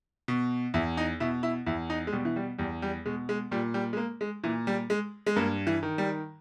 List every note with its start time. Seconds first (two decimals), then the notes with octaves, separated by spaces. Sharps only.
0.28 B2
0.74 E2 E4
0.97 D#4
1.20 B2 E4
1.43 E4
1.66 E2 E4
1.90 D#4
2.07 G#3
2.12 B2 G3
2.25 E3
2.36 G3
2.58 E2 G3
2.82 G3
3.06 B2 G#3
3.29 G#3
3.51 A#2 G3
3.74 G3
3.93 G#3
3.97 A#3
4.21 G#3
4.44 A#2 E3
4.67 G3
4.90 G#3
5.26 G#3
5.36 G2 A#3
5.67 E3
5.83 D#3
5.98 G3